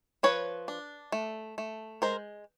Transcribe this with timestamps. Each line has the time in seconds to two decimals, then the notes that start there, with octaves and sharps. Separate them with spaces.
0.23 F3 B4 C#5
0.68 D4
1.12 A3
1.58 A3
2.02 G#3 A#4 C5